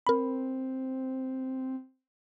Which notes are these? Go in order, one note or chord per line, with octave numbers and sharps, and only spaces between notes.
C4 A#4 B5